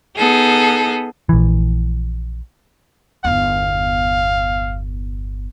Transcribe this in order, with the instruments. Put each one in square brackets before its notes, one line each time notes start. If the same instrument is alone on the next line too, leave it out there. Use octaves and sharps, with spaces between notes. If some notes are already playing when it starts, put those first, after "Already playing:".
[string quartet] B3 D#4 G#4 A4
[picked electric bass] A#1 E3
[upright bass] G1 E2 [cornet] F5